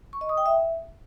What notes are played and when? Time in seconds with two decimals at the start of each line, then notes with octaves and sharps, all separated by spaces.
0.13 C#6
0.21 D#5
0.29 D#6
0.38 G5
0.46 E5